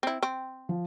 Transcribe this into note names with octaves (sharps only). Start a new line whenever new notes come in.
C4 E4
C4
F3